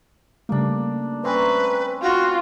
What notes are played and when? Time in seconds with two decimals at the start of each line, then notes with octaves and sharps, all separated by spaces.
0.49 C#3 G3 A3 A#3 D4
1.24 A3 C4 C#4 B4 C5 A#5 C6
2.02 F4 F#4 G5